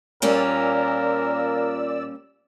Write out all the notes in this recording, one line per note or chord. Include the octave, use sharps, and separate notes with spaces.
A#2 G3 A#3 C#4 A#4 D5 E6